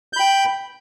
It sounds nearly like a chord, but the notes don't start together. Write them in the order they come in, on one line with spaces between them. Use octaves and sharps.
G6 B5 G5